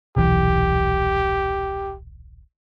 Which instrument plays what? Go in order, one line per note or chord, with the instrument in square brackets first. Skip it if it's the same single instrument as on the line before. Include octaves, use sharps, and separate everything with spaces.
[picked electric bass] D#1 B1 E3 [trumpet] G4